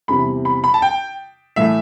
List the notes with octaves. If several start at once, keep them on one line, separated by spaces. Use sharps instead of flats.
E2 C3 E3 G3 B5
B5
B5
A5
G5
A2 E3 A3 E5